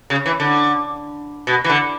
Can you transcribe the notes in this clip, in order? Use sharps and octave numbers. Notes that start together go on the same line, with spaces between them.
C#3
E3
D3
B2
E3
D3